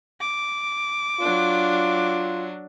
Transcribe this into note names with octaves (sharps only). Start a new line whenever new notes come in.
D6
F#3 D4 F4